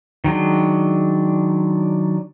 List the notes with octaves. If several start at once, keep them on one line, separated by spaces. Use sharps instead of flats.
D#3 F#3 G#3 D4